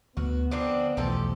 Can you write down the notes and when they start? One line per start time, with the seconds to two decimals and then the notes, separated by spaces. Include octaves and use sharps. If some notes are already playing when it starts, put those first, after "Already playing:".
0.17 D2 B3 F#4
0.51 D3 F3 C4 D4
0.97 B1 E2 F3 A3 G4 A4